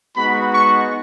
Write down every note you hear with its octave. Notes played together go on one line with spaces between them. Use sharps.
G#3 B3 D#4 F#4 B5
C#6